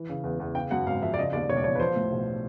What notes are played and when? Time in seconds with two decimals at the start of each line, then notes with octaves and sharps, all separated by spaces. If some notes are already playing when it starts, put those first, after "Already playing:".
Already playing: E3
0.09 C#3
0.24 E2
0.40 E2
0.55 C#3 G5
0.71 F#2 F#5
0.86 G#1 F5
1.02 F3 E5
1.14 D5
1.18 C#3 D#5
1.33 D#2 D5
1.49 E1 C#5
1.57 D5
1.64 F3 C#5
1.75 B4
1.80 F3 C5
1.96 A2
2.12 B1